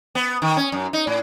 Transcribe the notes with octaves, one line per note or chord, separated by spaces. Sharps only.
B3
D#3
C#4
F#2
D#4
A2